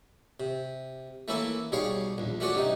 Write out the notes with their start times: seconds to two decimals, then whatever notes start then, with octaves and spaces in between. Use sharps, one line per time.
0.40 C3
1.28 E3 A3 A#3 C#4 E4 A4
1.72 B1 G3 G#4 C#5 F5
2.18 A#1 E2
2.40 A3 C#4 F#4 C#5 D5
2.55 G2 C3 D#4